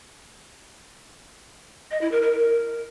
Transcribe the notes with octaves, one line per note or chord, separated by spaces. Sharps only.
D#5
E4
A#4
A#4
A#4